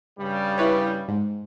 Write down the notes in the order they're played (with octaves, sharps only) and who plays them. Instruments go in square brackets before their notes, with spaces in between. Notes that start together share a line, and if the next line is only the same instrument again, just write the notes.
[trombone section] G2 C#3 G3
[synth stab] E4 B4 C#5
G#2